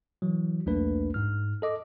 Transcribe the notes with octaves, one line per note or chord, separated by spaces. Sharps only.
E3 F#3
B1 E2 A3 A#3 D4 B4
G#2 F6
A4 D#5 D6